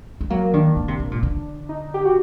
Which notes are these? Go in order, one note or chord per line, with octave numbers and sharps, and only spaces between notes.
G3
F#3 A#3
D#3 D4
D#3
C3
C3
A#2
D3
D#4
G4
F#4